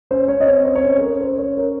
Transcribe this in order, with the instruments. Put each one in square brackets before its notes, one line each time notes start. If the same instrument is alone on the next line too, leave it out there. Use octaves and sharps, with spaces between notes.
[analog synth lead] C#4 [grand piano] C5
[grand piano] C#5
[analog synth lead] C#4 [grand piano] D#5
[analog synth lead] C4 [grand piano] C#5
[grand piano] C5
C#5
[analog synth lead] C#4 [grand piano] C5
[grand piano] A4
A#4
C5
C#5
A#4